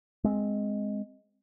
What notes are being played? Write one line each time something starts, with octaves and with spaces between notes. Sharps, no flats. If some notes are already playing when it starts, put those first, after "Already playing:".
G#3 C4